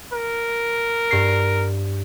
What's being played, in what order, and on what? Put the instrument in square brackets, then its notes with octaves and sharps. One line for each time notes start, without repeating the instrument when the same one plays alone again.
[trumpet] A#4
[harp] G2 C7